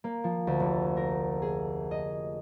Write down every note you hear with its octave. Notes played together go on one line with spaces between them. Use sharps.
A#3
F3
D2
F1
A#4
G#4
D#5